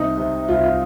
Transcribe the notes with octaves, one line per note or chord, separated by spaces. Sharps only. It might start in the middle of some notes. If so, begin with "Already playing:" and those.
Already playing: C2 D#4
C3
C2 F4
F4